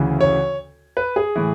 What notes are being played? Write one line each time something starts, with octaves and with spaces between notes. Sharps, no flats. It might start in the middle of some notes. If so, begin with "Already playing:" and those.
Already playing: D2 C#3 E3
C#5
B4
G#4
A2 E3